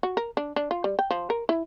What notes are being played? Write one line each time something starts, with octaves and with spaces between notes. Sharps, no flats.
F#4
A#4
D4
D4
F4
G3
G5
F3
A#4
E4